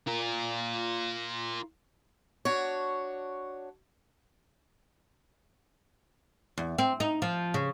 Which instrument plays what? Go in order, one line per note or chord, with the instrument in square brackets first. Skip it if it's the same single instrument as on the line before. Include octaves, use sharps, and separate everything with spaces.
[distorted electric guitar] F4 A#4
[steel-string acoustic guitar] D4 F#4 C#5
[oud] E2
C4
D#4
F3
C#3